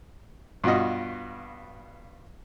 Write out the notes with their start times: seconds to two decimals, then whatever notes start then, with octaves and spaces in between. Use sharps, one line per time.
0.64 G2 B2 F4 F#4 D#5